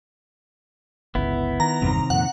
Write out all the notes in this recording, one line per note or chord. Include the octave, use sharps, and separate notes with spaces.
G1 C#2 B3 E4
D#3 A#5
G1 E2 G2 C3 D#3
F2 A#2 F#5